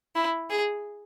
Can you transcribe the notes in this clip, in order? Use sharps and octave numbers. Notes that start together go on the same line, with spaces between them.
E4
G#4